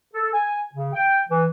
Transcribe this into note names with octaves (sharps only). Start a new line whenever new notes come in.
A4
G#5
C#3
G5
E3